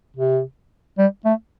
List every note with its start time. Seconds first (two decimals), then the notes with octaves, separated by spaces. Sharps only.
0.16 C3
0.98 G3
1.25 A3